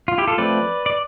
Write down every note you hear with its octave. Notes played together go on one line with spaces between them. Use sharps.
F4
E4 G4
F4 A4
F3 A3 C4 B4 D5
D5